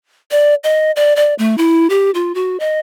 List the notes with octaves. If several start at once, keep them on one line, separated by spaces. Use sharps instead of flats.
D5
D#5
D5
D5
A3
E4
G4
F4
F#4
D#5